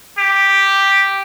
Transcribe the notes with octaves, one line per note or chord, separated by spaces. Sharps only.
G4